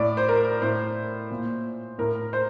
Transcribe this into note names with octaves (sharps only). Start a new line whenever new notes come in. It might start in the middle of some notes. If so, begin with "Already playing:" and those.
Already playing: A2 D5
C5
A#4
A2 C5
A#2
A2 A#4
C5